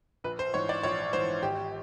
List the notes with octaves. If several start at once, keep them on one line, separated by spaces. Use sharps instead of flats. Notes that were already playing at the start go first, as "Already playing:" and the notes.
A#1 B4
C5
G#2 E3 C#5
D5
A#1 C#5
G#2 E3 C5
G#1 G4